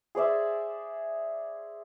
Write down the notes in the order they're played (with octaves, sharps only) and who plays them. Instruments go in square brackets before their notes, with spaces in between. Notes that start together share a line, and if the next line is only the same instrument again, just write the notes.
[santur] G#4 C5 D5 E5